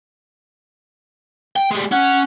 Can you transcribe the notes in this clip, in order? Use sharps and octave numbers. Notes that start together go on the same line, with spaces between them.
G5
G3 G#3
C#4 F#5